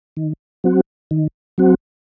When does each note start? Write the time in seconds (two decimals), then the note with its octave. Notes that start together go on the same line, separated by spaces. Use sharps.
0.17 D#3
0.64 F#3 C4 F#4
1.11 D#3
1.58 F#3 C4 F#4